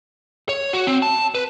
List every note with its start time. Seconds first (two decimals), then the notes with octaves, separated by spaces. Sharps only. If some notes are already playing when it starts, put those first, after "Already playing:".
0.49 C#5
0.73 F#4
0.87 C4
1.02 A5
1.35 B4